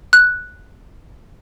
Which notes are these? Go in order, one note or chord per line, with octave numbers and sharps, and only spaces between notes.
F#6